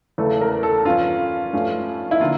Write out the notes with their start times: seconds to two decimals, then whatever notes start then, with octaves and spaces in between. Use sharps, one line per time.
0.18 E2 C#3 E3 A3 A4
0.41 A#4
0.63 A4
0.85 G2 F3 C#4 F4
1.53 G2 F3 A3 C#4
2.11 E4
2.20 D3 F3 A#3 F4